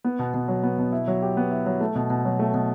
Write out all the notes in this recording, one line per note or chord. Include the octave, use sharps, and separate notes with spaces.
B3
B2
B2
F#3
B3
B2
E4
F#3
G4
B3
E4
F#3
A3
B2
B2
F#3
A3
B2